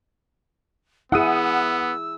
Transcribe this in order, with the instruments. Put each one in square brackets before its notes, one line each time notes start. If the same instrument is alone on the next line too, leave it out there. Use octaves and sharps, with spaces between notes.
[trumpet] B3 [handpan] E4 G#4 [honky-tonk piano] F#5 D#6 D#7 [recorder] E6